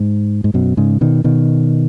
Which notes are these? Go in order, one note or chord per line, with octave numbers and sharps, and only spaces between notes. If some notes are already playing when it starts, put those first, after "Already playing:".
Already playing: G#2
G#2
F#2 B2
G#2 C#3
B2 D#3
B2 D#3